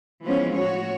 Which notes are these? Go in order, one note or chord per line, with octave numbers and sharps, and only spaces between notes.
E3 F3 G#3 B3 C#4
A2 F#4 C#5